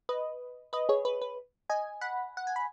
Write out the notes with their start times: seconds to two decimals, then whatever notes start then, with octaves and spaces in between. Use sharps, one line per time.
0.09 B4 D#5
0.73 B4 D#5
0.89 G#4 C#5
1.05 B4
1.22 B4
1.70 D#5 G#5
2.01 F#5 B5
2.37 F#5
2.47 G#5
2.56 B5